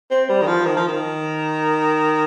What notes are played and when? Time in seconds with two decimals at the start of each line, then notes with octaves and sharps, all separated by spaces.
0.11 C4
0.29 G3
0.41 D#3
0.47 F3
0.65 D#3
0.77 F3
0.88 D#3